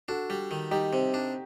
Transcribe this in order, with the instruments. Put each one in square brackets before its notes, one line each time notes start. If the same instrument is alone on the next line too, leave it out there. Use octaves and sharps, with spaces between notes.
[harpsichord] D4 [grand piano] F#4 A4
[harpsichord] G3
D#3
[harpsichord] G3 [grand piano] D#4 G4
[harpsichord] C3
D4